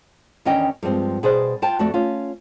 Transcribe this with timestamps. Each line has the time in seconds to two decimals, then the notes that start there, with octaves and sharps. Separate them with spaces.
0.45 E2 D#3 C#4 D4 D#5 G5
0.83 G2 F3 G#3 C4
1.23 B2 G#4 C5 D5
1.62 F4 C5 G5 A5
1.79 F2 A3 F#4 D5
1.94 C#4 F4